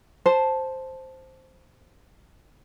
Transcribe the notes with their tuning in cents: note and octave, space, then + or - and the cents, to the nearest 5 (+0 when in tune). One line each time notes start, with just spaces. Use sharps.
C5 +0 A5 -5